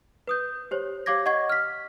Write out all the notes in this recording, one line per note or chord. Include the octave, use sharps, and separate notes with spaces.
B4 D#6 G6
G4 C5 C#5
G4 C#5 F5 D6 G#6 A#6
D#5 F#5 C#6 G#6
F6 B6